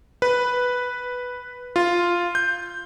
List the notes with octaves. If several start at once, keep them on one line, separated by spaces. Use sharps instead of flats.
B4
F4
G6